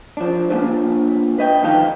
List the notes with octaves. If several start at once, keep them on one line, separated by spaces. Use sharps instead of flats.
F3 D4
A#3 B3 C#4 D4 F4 B4
B4 D#5 G5
D#3 F3 A4 F5 G5